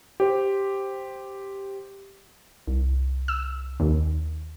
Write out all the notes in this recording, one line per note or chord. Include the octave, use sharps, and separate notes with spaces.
G4 C5
C2
E6
D#2